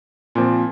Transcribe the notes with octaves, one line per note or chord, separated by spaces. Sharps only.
A#2 F3 C4